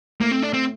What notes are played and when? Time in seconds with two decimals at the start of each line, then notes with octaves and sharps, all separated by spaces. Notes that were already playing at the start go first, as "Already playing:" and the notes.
0.21 A3 A#3
0.32 C4
0.42 D4
0.53 C4